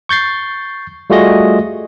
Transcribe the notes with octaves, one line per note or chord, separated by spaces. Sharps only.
C#6 G6 A6 C7
G3 A3 F4 F#4 G#4 D#5